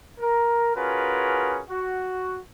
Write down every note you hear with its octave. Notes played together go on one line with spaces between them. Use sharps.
A#4
C#4 F4 F#4 G#4 A#4 B4
F#4